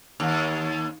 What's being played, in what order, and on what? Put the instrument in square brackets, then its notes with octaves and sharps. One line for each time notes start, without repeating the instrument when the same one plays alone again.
[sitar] D#2